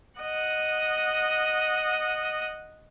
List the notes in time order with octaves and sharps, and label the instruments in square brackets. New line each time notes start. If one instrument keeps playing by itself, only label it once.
[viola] D#5 F#5